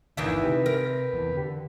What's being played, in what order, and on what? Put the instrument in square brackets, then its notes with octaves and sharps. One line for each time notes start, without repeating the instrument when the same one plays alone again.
[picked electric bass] G1 D2 [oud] D#3 E3 E5
[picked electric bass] C3 [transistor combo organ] G4 B4
[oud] A#4
[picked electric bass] E2 E3
D3